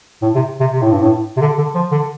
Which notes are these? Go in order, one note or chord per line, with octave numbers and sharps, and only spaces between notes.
A2
C3
C3
C3
A2
G2
A2
C3
D3
D3
F3
D3